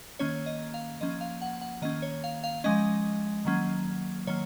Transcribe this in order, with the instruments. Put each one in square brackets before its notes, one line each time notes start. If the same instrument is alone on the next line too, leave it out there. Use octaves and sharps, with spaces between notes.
[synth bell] D#3 A#3 C#4 C#5
D#5
F5
F3 A#3 C#4 D#5
F5
F#5
F#5
D#3 A#3 C#4 D#5
C#5
F5
F5
F3 G#3 C#4 D#5
D#3 F#3 A#3 C#4
D#3 F#3 A#3 C#5